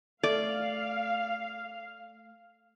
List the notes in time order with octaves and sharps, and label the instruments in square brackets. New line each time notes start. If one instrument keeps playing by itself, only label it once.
[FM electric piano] A3 [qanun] D5 [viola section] F5